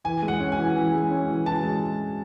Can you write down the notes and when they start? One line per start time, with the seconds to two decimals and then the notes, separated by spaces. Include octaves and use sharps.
0.04 E3 G#5
0.23 G#3
0.28 F#5
0.40 C#4
0.52 G#5
0.58 E3
0.76 E3
0.93 G#3
1.11 C#4
1.28 E3
1.46 E3 A5
1.64 G#3